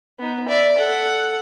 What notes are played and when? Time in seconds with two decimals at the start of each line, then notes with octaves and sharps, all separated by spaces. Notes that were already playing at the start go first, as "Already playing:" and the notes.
0.19 B3 D#4
0.48 D5 E5
0.78 A4 F#5